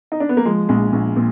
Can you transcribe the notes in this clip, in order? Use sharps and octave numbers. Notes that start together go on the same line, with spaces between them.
D#4
D4
B3
A#3
F3 G#3
A#1 G#3
A#1
A#2